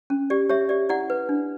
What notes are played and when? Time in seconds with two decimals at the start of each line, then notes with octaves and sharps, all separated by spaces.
0.10 C#4
0.30 G4 D5
0.49 G4 C#5 E5
0.69 G4 D5
0.89 E4 D5 F#5
1.10 B4
1.29 D4